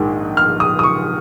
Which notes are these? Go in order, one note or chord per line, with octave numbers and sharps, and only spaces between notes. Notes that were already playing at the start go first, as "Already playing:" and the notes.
Already playing: A#1 G#2 D#3 G#3
F6
D#6
D#6
C#6